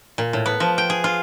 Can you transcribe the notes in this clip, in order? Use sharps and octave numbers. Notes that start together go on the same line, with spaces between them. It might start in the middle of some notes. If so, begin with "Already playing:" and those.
A#2
A2
B3
F3
G5
G#4
F4